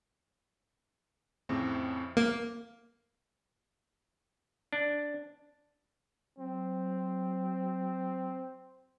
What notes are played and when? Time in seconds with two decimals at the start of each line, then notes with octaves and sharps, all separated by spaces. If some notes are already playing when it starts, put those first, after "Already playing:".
1.49 F2 A2 C#3 C4
2.17 A#3
4.73 D4
6.39 F#3 C4